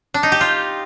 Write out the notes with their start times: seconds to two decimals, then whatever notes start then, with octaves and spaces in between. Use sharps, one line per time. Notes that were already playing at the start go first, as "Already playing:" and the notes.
0.14 D4
0.23 D#4
0.32 G4
0.41 F4